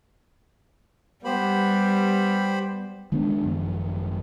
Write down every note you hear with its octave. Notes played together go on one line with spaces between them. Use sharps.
G3 B3 G4 C5 B5
D#3 G#3 B3 D4
G#1 F#2 D#3 F3